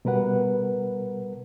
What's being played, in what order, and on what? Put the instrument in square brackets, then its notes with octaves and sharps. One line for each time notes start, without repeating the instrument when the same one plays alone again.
[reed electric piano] B2 G3 A#4 B4 F#5